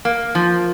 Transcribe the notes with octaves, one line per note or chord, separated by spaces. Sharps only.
A#3
F3